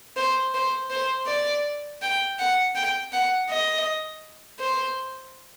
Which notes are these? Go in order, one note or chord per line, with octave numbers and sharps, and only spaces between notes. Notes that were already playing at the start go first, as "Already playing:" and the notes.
C5
C5
C5
D5
G5
F#5
G5
F#5
D#5
C5